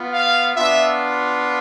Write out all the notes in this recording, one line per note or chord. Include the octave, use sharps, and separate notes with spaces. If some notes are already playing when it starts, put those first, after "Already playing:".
Already playing: B3 F4
F5
B3 D4 F4 E5